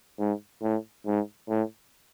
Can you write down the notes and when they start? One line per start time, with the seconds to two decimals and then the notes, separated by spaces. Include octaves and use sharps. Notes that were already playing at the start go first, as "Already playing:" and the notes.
0.19 G#2
0.62 A2
1.06 G#2
1.49 A2